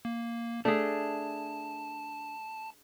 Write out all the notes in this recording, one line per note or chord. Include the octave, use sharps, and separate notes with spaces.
A#3
A3 D4 G#4 A5